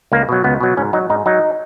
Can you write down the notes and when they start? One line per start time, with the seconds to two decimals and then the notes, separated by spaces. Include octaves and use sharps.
0.12 C#2 A#3
0.29 B2 F#3
0.44 C#2 B3
0.61 B2 F#3
0.77 G#2 C#4
0.93 F#3 D#4
1.10 G#2 D#4
1.26 F#3 D#4